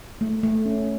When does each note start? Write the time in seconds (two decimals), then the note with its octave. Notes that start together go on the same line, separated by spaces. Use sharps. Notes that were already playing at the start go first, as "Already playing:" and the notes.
0.21 A3
0.43 A3
0.66 C#4